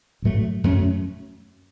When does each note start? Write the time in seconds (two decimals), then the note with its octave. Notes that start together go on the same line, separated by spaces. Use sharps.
0.22 A1 A2 F#3 A3
0.64 F#2 F#3 A3 C#4